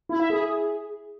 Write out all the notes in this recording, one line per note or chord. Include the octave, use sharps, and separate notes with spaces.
E4
E5
G#4